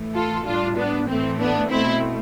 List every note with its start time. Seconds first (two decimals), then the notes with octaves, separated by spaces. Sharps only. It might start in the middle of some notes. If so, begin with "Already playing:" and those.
Already playing: A2 E3 A3
0.15 F4 A4
0.46 A2 G3 D4 F4
0.77 B3 D4
1.08 A2 E3 A3 C4
1.40 B3 D4
1.70 B2 A3 C4 E4